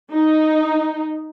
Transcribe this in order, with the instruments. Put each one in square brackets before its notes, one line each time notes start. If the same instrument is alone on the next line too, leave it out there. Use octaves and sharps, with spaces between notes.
[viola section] D#4